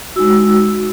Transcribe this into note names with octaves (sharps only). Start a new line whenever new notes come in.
G#3 D#4 F#4 E6